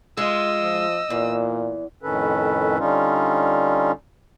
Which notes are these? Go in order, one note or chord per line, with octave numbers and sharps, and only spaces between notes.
G#3 F4 D#5 E6
F3
E2 A#2
F2 A2 D#3 C#4 A4 B4
D3 G3 C#4 D#4 F4